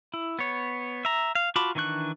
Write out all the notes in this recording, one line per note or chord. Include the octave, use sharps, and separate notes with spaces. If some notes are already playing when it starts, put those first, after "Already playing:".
E4
B3 C#5
E5 A#5
F5
F4 F#4 A5 B5 D6
D#3 E3 D4 C#6 F#6